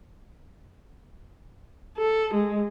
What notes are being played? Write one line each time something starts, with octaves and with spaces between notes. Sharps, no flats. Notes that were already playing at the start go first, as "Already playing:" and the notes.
A4
G#3